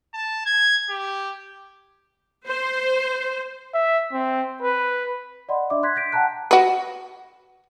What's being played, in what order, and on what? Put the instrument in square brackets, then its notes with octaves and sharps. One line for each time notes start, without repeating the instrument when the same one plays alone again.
[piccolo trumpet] A5
G#6
G4
[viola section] C5
[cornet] E5
C4
B4
[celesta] D5 D#5 F#5 B5 C6
D4 D5 E5 D6
C6 F#6 G#6 B6
G6 A#6 B6 D7
F#5 G5 A5 A#5 F#6
[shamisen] F#4 B4